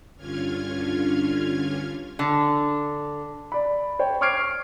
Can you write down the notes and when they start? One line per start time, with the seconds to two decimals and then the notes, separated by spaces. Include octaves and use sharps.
0.17 G2 D3 C#4 F4 F6 G#6
2.19 D3
3.52 D5 B5
3.99 C5 C#5 G5
4.21 C#6 D6 F6 G#6 C7 D7